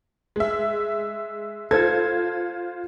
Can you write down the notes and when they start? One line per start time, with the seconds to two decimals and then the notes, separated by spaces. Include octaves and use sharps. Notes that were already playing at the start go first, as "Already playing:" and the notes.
0.36 G#3 E5
1.71 F4 A4 C5 G#6